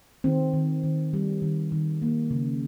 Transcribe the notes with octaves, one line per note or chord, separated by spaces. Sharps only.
D#3 C4
D#3
D#3
G3
D#3
D#3
A#3
C#3